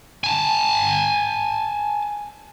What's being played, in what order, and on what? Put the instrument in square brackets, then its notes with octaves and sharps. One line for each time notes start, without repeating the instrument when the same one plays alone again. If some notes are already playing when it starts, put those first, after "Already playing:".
[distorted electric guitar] G#5 A5